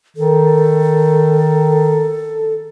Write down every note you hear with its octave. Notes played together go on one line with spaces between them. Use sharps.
D#3 A4